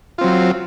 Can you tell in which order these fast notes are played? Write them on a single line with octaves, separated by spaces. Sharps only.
F4 C4 F#3